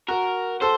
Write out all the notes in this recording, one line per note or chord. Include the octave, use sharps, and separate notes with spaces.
F#4 A#4
A4 C5